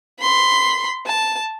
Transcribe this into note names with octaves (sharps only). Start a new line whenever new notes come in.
B5 C6
A5